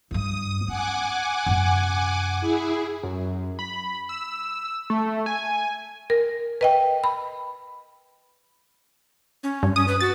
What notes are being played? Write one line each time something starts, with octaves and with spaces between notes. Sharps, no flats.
G2 D#4 D#6
C#4 F#5 G#5 D6
F#2 C3
E4 G#4
F#2
B5
E6
A3
G#5
A#4
B4 D#5 G5
B5
C#4
G2
C#4 D#6
B4
F#4 A6